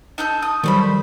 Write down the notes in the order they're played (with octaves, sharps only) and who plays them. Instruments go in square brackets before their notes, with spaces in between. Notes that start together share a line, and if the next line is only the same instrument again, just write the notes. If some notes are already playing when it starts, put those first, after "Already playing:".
[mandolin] D#4 A4 G6
D#6
[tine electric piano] D#3 F#3 G3 [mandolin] A3 C5 B5